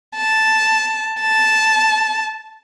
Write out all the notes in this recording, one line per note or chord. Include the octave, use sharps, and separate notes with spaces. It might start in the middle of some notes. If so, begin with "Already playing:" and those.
A5
A5